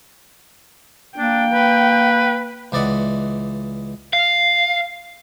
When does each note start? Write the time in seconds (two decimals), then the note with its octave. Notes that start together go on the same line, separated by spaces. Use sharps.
1.18 A#3 D4 G5
1.53 B4
2.72 C#2 E3 D5 D#5 F#5
4.13 F5